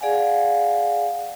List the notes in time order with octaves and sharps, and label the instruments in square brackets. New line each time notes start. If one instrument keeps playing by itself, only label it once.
[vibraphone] G#4 D5 F5 F#5 G#5